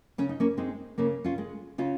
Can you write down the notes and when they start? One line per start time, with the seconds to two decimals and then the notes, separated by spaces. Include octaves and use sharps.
0.18 C#3 C#4
0.29 D#4
0.40 A#3 C#4
0.57 G#3 C4 D#4
0.98 C#3 A#3 C#4
1.24 C#4 F4
1.38 G#3
1.78 C#3 C#4 F4